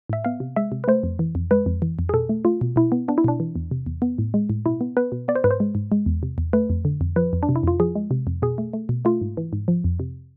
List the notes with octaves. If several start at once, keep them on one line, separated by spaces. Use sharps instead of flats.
A2 E5
B3 F5
C3
G#3 E5
C3
B4
A3 C5
F2
E3
F2
G#3 B4
F2
E3
F2
G#4
B2 A4
A3
A3 F4
B2
B2 E4
B3
B3 D4
E4
B2 D4
E3
E2
C3
E2
B3
A2
G#3
A2
B2 E4
B3
B3 B4
B2
B3 D5
C5
G#2 B4
C5
G#3
G#2
G#3
E2
C3
E2
A3 B4
F2
D3
F2
F3 B4
F2
D4
C3
E4
F2 F4
F3 G#4
G#3
C3
F2
B2 G#4
A3
A3
B2
A3 F4
G#2
E3
G#2
F3
F2
C3